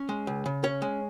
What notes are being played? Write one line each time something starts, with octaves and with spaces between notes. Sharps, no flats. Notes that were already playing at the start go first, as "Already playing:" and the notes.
Already playing: C#4
G#3
C#2
C#3
C#4 C#5
G#3